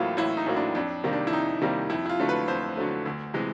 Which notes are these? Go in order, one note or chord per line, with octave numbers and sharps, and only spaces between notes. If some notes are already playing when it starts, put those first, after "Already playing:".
Already playing: A1 A2 F#3 A#3 E4 F4
A1 E4
D#4
A2 F#3 A#3
D4
F2 D4
C3 D#3 G3 A#3
D4
E4
F2 D#4
C3 D#3 G3 A#3
F2 E4
E4
F4
D3 F#3 A3
B4
F2 C5
D3 F#3 A3
D2
C3 E3 G#3